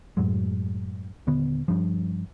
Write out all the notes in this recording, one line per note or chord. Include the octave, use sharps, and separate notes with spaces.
F#2 A2 F#3 G#3
D#1 D3 B3
G2 F3